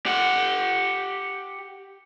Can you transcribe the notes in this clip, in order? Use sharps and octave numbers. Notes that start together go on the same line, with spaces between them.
G4 F#5